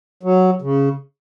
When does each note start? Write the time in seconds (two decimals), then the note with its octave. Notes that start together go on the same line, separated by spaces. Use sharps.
0.23 F#3
0.62 C#3